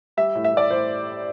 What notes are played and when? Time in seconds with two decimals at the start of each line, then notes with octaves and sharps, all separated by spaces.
0.17 G3 E5
0.35 A2
0.44 E5
0.53 A2 D5
0.70 A2 C5